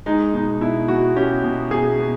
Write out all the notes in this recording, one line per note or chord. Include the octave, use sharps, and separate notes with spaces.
G#3 D#4
B2 D#4
B2 E4
B2 F#4
C#4 G4
B2
B2 G#4
B2